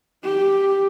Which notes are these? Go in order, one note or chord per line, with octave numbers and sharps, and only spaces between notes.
G4